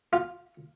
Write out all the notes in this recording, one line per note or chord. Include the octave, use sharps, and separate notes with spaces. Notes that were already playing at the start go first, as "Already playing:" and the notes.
F4